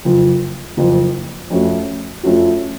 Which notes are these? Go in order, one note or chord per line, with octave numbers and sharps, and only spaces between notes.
F#1 F2 F3
F#1 F2 F3
F2 F3 A3 C#4 F#4
F2 F3 A3 C#4 F#4